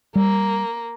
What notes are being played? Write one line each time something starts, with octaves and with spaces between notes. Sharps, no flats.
G3 A#3